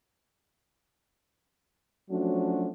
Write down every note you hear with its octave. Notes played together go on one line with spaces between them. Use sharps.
F3 F#3 A3 C#4 D4 F#4